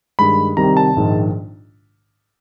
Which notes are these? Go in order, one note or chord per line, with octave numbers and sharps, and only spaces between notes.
G2 D#3 G#3 B5
C2 C3 D#3 G3 A#5
A5
A#1 G#2 D#3 G#3